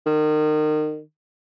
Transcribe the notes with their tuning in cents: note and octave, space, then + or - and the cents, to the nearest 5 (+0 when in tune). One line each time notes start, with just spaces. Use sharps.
D#3 -30